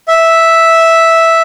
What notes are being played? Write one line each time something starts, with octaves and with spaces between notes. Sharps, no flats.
E5